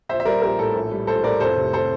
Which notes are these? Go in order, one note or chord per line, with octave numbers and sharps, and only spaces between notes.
A#1 C5 E5
E5
G3 A#4 D5
A#1 G4 A#4
A2 A4
A#1
G3
A#1 A4 C5
A2 A#4 D5
F1 A4 C5
C3
A4 C5